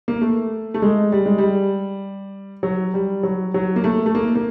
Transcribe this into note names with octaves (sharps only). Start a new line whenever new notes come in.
A#3
A3
A3
G#3
G3
G#3
G3
F#3
G3
F#3
F#3
A#3
A3
A3
A#3
A#3